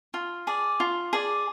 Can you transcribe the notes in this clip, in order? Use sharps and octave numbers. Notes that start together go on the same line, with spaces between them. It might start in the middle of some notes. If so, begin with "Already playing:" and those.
F4
G#4 D5
F4
G#4 D5